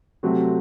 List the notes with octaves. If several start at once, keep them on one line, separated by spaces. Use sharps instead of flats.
C3 F#3 A3 C4 F#4